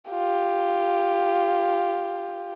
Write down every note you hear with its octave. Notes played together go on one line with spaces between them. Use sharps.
F4 G4